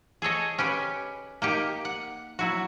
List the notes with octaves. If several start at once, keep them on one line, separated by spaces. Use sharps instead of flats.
G#4 A4 C#5 D#5
C#4 G4 B4
A#3 D#4 G4
F#5
F#3 E4 F#4